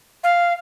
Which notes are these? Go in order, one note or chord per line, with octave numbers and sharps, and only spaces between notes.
F5